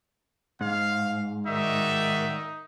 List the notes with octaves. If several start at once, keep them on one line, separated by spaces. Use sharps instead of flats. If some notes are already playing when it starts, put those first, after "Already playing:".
G#2 F5
D#3 D#4 F#4 D5 E5